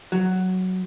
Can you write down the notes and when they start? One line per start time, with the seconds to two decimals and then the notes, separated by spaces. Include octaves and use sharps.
0.12 F#3